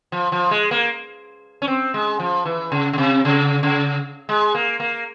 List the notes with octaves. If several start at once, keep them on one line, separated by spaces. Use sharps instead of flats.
F3
F3
G#3
A#3
C#4
C4
G#3
F3
E3
C#3
C#3
C3
C#3
C#3
G#3
A#3
A#3